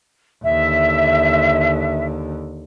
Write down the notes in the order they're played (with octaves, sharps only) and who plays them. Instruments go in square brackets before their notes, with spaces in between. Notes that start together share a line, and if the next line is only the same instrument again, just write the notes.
[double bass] D#2 D3 [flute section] E5